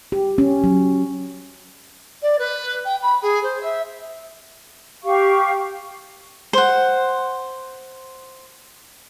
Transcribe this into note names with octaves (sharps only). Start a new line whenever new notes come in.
G4
C#4
F#3
D5
B4
G5
B5
G#4
C5
E5
G4 F5 C#6
C5 F#5